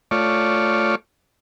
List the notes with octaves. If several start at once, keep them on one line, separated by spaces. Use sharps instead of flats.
A3 F4 C#5 D5